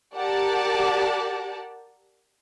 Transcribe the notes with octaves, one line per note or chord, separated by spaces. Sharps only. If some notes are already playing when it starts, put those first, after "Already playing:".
G4 A#4 D5 F#5 A5